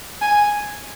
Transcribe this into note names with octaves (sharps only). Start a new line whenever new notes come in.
G#5